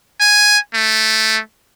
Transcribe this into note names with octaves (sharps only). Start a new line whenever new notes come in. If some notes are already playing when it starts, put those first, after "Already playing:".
G#5
A3